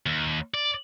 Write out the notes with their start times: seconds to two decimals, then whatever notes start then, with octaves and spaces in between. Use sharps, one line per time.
0.06 D#2
0.54 D5